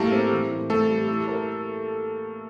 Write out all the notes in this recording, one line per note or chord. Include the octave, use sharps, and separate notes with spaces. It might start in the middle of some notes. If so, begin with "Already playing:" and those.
Already playing: A2 G3 A3 A#3 G4 A4 A#4
C4
E3
A2
A2 A3 A4
G3
E4
A#4